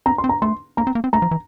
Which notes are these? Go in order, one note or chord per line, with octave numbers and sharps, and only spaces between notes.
C4 A#5
C6
C4
A#5
A3 C6
A#3 A#5
C4
A#3
C4
A3 A#5
F3
E3